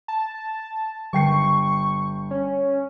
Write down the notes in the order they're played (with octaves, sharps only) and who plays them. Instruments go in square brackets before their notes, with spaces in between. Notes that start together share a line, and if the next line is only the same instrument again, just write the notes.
[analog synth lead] A5
[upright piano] G1 G5 C7 [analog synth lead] C#6
[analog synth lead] C#4